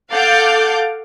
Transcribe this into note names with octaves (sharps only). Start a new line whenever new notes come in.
A4 F5 F#5 D6 G6 A6